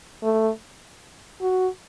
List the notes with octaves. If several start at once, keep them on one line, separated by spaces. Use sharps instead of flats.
A3
F#4